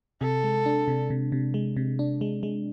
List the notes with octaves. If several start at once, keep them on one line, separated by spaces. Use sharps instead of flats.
C3 A4
G#3
D4
C3
C3
C3
G#3
C3
D4
G#3
G#3